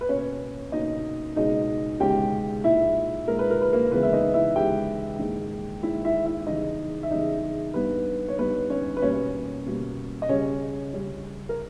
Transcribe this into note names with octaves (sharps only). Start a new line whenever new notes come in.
B4
B2 A#3 C#4 C#5
B2 A#3 C#4 D#4 D#5
C#2 B2 G#3 C#4 D#4 D#5
C#2 B2 G#3 C#4 G4 G5
A#2 G#3 D#4 E4 E5
A#2 G#3 D#4 A#4
B4
A#4
B4
A#3 A#4
C#2 C#3 E3 G#3 B3 B4
E5
D#4 D#5
E4 E5
C#2 C#3 E3 G#3 G4 G5
G#2 D#3 A#3 D#4
G#2 D#3 A#3 D#4 E4 E5
E4 E5
E4 E5
E2 C#3 G3 D#4 D#5
E5
E2 C#3 G3 D#4 D#5
G2 G3 B3 D#4 B4
C#5
G2 G3 B3 D#4 B4
C#4 C#5
B4
B2 G3 A#3 C#4 C#5
B2 G3 A#3
D#5
C#3 G3 C#4 C#5
C#3 G3 C#4
A#4